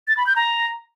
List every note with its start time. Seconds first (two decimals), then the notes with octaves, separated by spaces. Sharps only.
0.08 A6
0.17 B5
0.27 G6
0.36 A#5